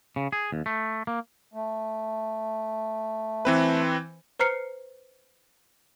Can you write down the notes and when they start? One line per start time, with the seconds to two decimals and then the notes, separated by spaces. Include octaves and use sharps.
0.16 C#3
0.32 G#4
0.52 D#2
0.66 A3
1.07 A#3
1.53 A3
3.45 E3 C4 B4
4.39 B4 C5 A#5 F6 C7 C#7